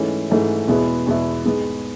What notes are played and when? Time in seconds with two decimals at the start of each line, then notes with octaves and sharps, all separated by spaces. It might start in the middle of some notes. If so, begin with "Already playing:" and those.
Already playing: G#2 E3 A3 C#4
0.30 G#2 E3 A3 C#4
0.68 E2 B2 G#3 B3 E4
1.07 E2 B2 G#3 B3 E4
1.46 G#2 G#3 B3